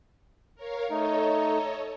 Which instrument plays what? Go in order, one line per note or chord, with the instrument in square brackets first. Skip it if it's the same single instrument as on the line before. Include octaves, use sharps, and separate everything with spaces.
[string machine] A#4 C#5 F5
[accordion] A3 D#4 [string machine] A4 C#5 D#5